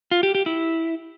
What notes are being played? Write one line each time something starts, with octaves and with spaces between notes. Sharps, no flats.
F4
G4
G4
E4